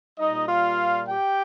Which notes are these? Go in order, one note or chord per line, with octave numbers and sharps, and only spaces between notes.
A#2 G3 D#4 D#5
F4 F5
G4 G5